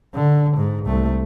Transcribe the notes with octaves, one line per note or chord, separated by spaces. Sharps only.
D3
G#2
C2 A3